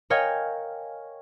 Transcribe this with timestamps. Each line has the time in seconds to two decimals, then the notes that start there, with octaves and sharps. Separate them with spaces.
0.10 A#4 C#5 D#5 F5 G5 G#5